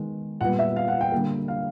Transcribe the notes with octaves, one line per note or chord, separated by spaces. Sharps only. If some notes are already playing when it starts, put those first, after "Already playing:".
Already playing: D#3 G#3 B3
A#2 G3 B3 F#5
E5
F5
F#5
G5
D3 G3 A#3
F5